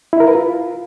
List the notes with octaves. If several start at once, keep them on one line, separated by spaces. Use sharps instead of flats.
E4
A#4
B4
F4